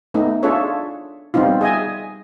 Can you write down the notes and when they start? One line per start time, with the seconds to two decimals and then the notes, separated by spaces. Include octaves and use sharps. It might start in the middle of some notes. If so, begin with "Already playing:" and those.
0.14 A3 B3 D#4
0.43 D4 F4 G#4 A4 C#5 E5
1.34 G3 B3 C4 D#4 F4
1.61 G#4 D#5 E5 G#5